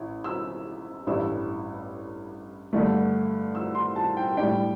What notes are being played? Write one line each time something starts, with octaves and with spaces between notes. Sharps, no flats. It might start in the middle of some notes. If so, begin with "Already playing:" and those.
Already playing: A1 E4
E6
A1 G2 G3 E4 E6
G2 D3 A3
E6
C6
A5
G5
A2 G3 D4 G5